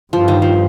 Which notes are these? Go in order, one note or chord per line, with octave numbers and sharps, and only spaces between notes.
G2 F3
D#3
F3